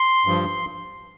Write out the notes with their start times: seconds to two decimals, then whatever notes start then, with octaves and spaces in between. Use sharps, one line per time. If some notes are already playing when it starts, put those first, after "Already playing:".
Already playing: C6
0.26 G2 F3